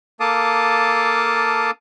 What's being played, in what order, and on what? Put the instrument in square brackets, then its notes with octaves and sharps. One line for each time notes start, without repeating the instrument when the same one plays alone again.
[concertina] A#3 A4 F5 A5 D6 D#6